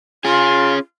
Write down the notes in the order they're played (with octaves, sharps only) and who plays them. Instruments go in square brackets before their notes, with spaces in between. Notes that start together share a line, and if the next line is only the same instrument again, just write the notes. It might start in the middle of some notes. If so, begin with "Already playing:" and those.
[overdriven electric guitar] C#4 G#4 [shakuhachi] F4